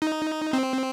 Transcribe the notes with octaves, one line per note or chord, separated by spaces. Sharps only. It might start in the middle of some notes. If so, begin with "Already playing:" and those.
D#4
C4